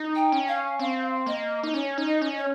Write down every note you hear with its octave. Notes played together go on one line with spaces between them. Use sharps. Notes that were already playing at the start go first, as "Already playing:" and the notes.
Already playing: D#4
G5
C#4
F5
C4 F5
A#3 D#5
D#4
C#4 C#5
D#4
D#5
C#4
C#5